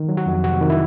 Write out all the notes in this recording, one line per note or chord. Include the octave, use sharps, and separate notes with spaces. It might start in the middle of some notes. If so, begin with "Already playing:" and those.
Already playing: D#3
F#3
F#4
F2
C3 F#4
D#3
E4